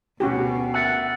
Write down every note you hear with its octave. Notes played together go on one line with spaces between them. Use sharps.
D2 B2 C#4 F#4 G4
A#4 E5 F#5 E6 F#6 A6